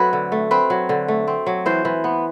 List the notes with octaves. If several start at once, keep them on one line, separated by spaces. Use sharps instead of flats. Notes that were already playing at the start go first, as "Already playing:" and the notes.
Already playing: F#3 A3 C4 B4
D3
A3
C4 B4
F#3
D3
A3
C4
F#3
E3 C5
E3
B3